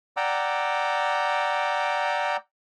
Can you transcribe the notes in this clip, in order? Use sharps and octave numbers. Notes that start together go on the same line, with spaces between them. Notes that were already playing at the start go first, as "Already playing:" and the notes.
D5 F#5 G5 A#5 D6 E6